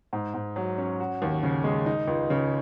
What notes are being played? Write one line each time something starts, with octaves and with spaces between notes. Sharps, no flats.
G#2
G#2
F#3
C#4
F#4
D#2
C#3
G#3
D#4
C#2
C#3